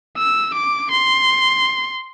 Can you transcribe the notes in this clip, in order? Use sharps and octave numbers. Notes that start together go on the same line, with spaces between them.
E6
D6
C6